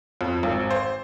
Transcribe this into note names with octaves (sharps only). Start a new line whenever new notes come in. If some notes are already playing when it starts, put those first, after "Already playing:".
F2
G#1
C5